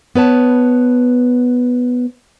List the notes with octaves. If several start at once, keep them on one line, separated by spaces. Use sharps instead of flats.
B3 B4 C#5 A5